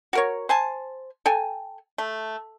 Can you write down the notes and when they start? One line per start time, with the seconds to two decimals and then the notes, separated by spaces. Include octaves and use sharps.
0.13 F#4 A#4 C#5
0.49 C5 G#5 A5
1.26 A4 G5 G#5
1.98 A3